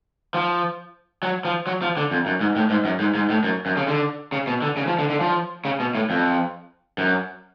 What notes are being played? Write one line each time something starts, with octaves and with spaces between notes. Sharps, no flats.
F3
F#3
F3
F#3
F3
D3
F2
F#2
G#2
A2
G#2
F#2
G#2
G#2
A2
F#2
F#2
C#3
D3
C#3
B2
D3
C#3
F3
D3
D3
F3
C#3
B2
A2
F2
F#2